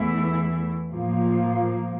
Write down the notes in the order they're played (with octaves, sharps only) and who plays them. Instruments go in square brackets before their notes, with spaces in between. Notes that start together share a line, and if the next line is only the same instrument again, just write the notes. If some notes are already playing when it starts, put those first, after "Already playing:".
Already playing: [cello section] E2 E3 A3 E4
A2 F3 A#3